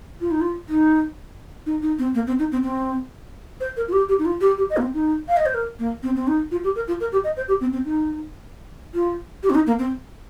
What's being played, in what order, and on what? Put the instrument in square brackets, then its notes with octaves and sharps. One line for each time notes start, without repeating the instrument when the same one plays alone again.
[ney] F4
D#4
F4
D#4
D#4
D#4
C4
A#3
C4
D#4
C4
C4
C5
A#4
F4
G4
G4
D#4
F4
G4
G4
D#5
A#3
C4
D#4
F5
D#5
C5
A#4
A#3
C4
C4
D#4
F4
G4
A#4
F4
A#4
G4
D#5
C5
G4
C4
C4
D#4
F4
G4
C4
D#4
A#3
C4